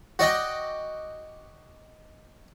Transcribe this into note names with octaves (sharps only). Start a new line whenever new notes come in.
F#4 D5 D#5 G5